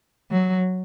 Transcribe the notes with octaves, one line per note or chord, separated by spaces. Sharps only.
F#3